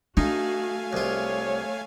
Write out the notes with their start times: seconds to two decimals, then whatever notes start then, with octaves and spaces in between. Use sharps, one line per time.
0.17 A3 D4 D#4 F#4 F5 G#5
0.93 C2 F4 C#5